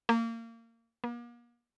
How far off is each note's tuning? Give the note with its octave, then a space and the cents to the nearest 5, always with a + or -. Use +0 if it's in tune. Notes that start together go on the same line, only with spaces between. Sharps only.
A#3 -25
A#3 +40